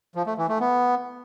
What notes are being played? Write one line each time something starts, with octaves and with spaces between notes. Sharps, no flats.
F3
A3
E3
A3
B3